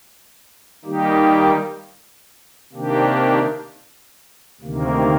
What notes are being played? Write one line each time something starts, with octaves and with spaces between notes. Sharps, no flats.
D#3 G3 A#3 D#4 G4
C3 D#3 A#3 D4 G4
D2 C3 D#3 A#3